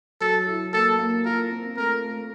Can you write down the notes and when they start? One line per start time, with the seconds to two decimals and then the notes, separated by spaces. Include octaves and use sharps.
0.21 F#3 A4
0.47 E4
0.73 A#3 A4
0.98 A#3
1.25 F4 A#4
1.51 C4
1.76 A3 A#4
2.03 A3